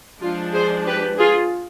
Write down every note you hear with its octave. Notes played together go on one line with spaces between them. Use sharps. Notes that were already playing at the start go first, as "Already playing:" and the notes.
F3 G#3 D4 F4
G#4 C5
G4 B4
F4 G#4